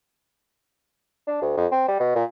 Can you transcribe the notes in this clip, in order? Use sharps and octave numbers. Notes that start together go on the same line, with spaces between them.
D4
D2
F2
C4
G3
B2
A#2